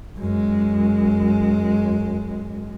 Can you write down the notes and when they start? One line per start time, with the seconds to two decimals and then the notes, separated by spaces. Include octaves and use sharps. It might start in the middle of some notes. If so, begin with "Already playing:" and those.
0.18 F#2 G#3